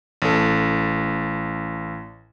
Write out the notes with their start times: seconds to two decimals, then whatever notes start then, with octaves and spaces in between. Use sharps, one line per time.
0.22 A1 A4